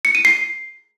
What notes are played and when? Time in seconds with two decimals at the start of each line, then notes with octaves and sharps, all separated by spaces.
0.05 C#7
0.15 D#7
0.25 C7